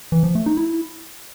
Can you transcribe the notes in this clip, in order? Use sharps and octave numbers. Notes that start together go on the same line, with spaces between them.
E3
F3
A3
D#4
E4